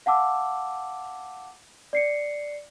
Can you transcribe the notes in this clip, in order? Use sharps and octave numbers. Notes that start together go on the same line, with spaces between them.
F5 F#5 A5 D6 E6
D5 C7 C#7